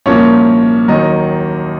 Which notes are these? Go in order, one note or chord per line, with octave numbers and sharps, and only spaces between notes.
C2 A#2 F3 A#3 C#4 C#5
D#2 D#3 F#3 D#4 D#5